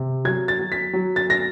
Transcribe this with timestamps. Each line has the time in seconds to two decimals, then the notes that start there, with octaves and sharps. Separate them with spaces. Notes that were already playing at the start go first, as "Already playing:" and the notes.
Already playing: C3
0.25 F#3 G#6
0.48 A6
0.59 F#3
0.72 B6
0.93 F#3
1.16 A6
1.30 A#6